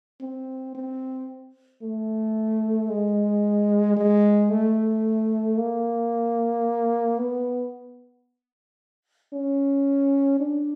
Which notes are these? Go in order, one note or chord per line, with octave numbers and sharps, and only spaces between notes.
C4
C4
A3
G#3
G#3
A3
A#3
B3
C#4
D4